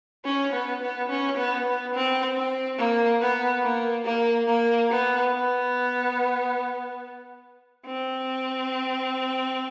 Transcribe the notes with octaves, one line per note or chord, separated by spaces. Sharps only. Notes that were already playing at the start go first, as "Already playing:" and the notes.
C#4
B3
B3
C#4
B3
B3
C4
C4
A#3
B3
A#3
A#3
A#3
B3
B3
C4